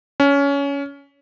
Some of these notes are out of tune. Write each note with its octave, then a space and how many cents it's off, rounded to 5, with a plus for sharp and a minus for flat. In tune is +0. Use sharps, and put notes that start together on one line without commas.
C#4 +20